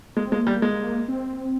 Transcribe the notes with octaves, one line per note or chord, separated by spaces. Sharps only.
G#3 A#3
C4
G#3
A#3
G3
G#3
C4